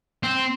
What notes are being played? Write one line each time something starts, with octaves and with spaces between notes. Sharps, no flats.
C4